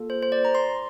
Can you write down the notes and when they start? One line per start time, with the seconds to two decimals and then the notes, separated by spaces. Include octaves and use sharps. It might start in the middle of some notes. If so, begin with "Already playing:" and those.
Already playing: A#3 F4 A4
0.10 C5
0.22 C5
0.32 D5
0.45 A#5
0.55 C6